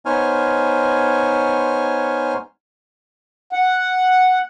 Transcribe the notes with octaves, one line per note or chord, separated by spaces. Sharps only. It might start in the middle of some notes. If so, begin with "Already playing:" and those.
B3 D#4 C5 C#5 G#5 F6
F#5